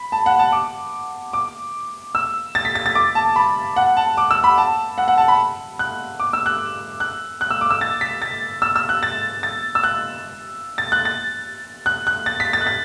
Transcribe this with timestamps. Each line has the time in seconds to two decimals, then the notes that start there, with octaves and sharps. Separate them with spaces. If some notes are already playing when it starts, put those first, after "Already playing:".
Already playing: B5
0.12 A5
0.26 F#5
0.39 A5
0.52 D6
1.33 D6
2.15 E6
2.55 A6
2.65 B6
2.75 A6
2.86 A6
2.95 D6
3.15 A5
3.36 B5
3.76 F#5
3.97 A5
4.17 D6
4.31 E6
4.44 B5
4.58 A5
4.98 F#5
5.08 F#5
5.18 A5
5.28 B5
5.79 F#6
6.20 D6
6.33 E6
6.46 F#6
7.00 F#6
7.41 F#6
7.50 E6
7.61 D6
7.70 E6
7.81 A6
8.01 B6
8.22 A6
8.62 E6
8.76 E6
8.89 F#6
9.03 A6
9.43 A6
9.75 E6
9.84 F#6
10.78 A6
10.92 F#6
11.05 A6
11.86 F#6
12.07 F#6
12.26 A6
12.40 B6
12.53 A6
12.61 F#6
12.67 A6